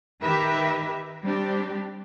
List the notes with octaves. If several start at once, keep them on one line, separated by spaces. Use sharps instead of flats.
D#3 D#4 G4 A#4 B4 E5
G3 C4 D4 G4